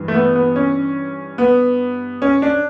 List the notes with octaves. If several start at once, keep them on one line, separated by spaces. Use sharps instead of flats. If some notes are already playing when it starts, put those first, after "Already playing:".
Already playing: G2 E3
A3
B3
B3
C#4
B3
C#4
D4